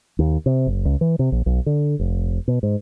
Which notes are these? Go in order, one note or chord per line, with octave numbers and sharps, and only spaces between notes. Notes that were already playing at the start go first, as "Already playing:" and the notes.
D#2
C3
F#1
C#2
E3
C3
A#1
B1
D3
F1
B2
G#2